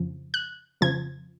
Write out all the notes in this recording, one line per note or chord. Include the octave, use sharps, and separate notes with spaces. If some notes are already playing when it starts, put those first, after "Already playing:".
Already playing: F2 C#3 F3
F#6
F2 C#3 F3 G#6